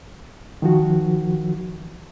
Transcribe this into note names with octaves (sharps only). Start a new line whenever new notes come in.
D#3 F3 F#4